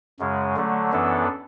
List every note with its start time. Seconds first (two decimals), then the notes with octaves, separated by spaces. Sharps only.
0.19 F#2 C#3 G#3
0.56 D3 F#3 A3
0.92 F#2 E3 B3 D4 A4